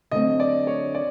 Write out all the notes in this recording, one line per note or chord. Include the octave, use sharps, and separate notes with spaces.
D3 F#3 A3 C4 D#5
D5
C#5
D5